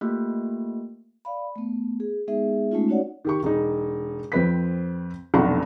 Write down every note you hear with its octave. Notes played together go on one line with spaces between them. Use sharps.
A3 A#3 F4 G4
D5 F5 B5
A3 B3
G#4
G#3 B3 D#4 G#4 E5
G#3 A3 C#4 D#4 F4
C#4 D#4 F#4 C#5 D5 F#5
D#3 G4 C#6
E1 D#4
F2 C4 B4 B6
F1 B1 D4 F4 B5 C#6